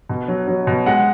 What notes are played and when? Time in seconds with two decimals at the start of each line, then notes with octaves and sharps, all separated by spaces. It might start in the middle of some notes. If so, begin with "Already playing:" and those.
0.09 B2
0.28 F#3
0.48 F#3
0.67 B2
0.86 G#3 F#5